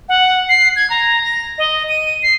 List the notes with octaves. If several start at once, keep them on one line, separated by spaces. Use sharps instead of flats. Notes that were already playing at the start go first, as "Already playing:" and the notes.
F#5
C7
G#6
A#5
A#6
D#5
D#7
C7